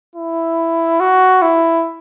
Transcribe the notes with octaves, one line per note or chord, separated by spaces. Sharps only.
E4
F#4
E4